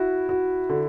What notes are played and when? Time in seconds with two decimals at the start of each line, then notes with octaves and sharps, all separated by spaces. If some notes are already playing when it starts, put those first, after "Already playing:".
Already playing: E4 F#4
0.29 F#4
0.69 D3